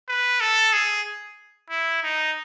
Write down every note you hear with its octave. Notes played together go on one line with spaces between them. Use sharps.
B4
A4
G#4
E4
D#4